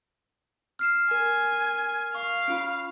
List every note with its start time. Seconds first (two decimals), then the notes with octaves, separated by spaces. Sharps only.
0.79 F6 C7 E7
1.11 A#4 G#5
2.15 F5 C#6
2.48 C#4 F4 B5